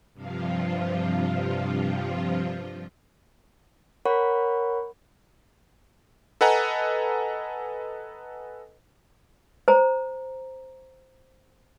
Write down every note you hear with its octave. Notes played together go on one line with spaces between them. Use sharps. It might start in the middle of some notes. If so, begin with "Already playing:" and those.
G2 C3 F3 F4
A#4 C#5 F#5 B5 C#6
A4 B4 D#5 F#5 G#5 A#5
C5 A#5